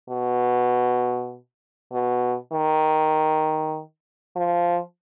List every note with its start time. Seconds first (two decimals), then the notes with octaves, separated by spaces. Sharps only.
0.09 B2
1.92 B2
2.53 D#3
4.36 F3